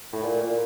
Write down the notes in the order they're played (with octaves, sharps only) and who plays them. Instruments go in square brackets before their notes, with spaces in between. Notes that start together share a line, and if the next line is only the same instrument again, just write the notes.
[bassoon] A2
A#2
A#2